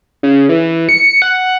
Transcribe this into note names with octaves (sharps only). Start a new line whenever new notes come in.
C#3
E3
C#7
F#5